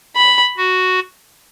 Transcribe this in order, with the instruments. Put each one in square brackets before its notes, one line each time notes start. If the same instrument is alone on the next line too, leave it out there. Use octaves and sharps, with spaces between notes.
[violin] B5
[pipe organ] F#4